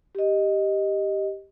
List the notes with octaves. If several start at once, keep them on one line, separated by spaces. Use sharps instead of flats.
G4 D#5